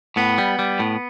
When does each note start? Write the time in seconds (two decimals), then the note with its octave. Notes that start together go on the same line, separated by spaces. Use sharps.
0.16 A2 B3
0.38 G3
0.59 G3
0.79 A2